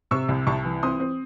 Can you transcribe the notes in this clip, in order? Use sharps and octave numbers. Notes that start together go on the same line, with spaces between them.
C3 C#6 E6
C2
C2 A5 C#6
E3
C4 C6 D#6
C4